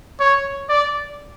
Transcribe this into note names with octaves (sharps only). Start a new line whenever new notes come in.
C#5
D5